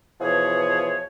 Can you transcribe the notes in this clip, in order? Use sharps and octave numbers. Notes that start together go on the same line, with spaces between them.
B2 E3 F3 G#4 C#5